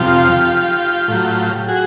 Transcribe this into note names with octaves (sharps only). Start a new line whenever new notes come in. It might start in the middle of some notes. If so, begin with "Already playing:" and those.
Already playing: F2 C3 F3 F4 G4
A2 F#3
F#4 G#4